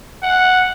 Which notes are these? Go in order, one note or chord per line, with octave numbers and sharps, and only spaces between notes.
F#5